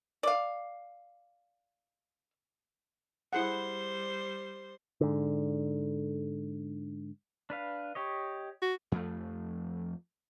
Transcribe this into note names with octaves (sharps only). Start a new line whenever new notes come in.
D5 F5
G3 E4 G#4 C5 F#5
G#2 D3
D4 B4 F5
G4 C#5 D#5
F#4
F2 F3 A3